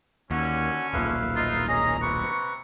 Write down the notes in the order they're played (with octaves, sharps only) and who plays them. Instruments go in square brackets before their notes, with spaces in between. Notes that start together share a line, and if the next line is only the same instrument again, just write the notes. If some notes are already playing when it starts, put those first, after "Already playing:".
[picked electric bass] D#2 [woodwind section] D3 C#4 [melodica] F#4
[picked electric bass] D#1 B1 A#2 [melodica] B4 E5 F5
[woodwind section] D#4 F4
[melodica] C#4 G#4 D#5 [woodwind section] A#5
[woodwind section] C3 A#5 C#6 [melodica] B4